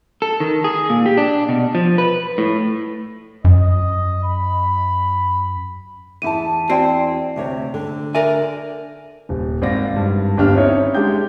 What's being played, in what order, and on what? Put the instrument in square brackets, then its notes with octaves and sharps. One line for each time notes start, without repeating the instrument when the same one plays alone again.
[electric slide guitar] A4
D#3
G#4
A#2
G4
D4
B2
F3
B4
A2
[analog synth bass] F#2 [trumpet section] D#5
[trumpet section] B5
[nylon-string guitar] E2 E4 A5 [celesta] D#7
[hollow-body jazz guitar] C4 [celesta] F#4 D5 G5
[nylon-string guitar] D2 C3 C#5
D3
[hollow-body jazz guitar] A#4 D5 G#5 [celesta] E5
[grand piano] D#1
G#1 C4 D5 F5 A#6
G#1 G2
G1 D#2 G3 D4 G4 F6
C4 C#4 D#4 E4 C#5
G#3 D4 G4 G6